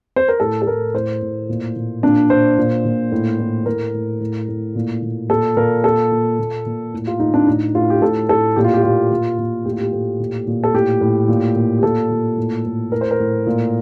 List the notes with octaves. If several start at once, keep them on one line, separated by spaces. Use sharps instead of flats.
C5
A#4
A2 A4
A4
A2 A#4
A2 C5
A2
A#2
A#2
A#2 D4
A#2 C5
A#2
A#2
A2
A2
A2 A#4
A2
A2
A2
A#2
A#2
A#2 A4
A#2 A#4
A#2 A4
A#2
A#2
A#2
A2
F4
A2 D#4
D4
A2 D#4
A2 F4
G4
A2 A4
A2 A4
A#2 G4
F4
G4
A#2 F4
A#2
A#2
A2 G4
F4
G4
A2
A#2
A#2
A4
A2 G4
A2
A#2
A#2
G4
A#2 A4
A#2
A2
A2
A2 A#4
C5
A#4
A2
A#2